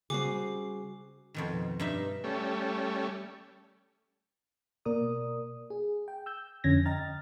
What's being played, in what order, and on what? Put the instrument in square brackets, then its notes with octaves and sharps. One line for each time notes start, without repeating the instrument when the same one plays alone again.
[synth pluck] C#3 G3 [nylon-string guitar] C4 F#4 G#4 [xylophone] D6 C7
[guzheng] F2 B2 D#3
G2 D#4 E5
[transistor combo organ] G3 A3 C#4
[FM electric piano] B2 A#3 A#4 D5 D#6
G#4
G5
E6 G6
F2 D3 C#4 G#6 A#6
D#5 G5 A#5 F6 A6